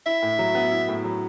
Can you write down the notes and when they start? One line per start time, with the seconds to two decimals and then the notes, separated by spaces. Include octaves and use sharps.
0.06 E4 E5
0.22 A2
0.39 F#3
0.55 B3
0.72 E4
0.88 A2
1.04 F#3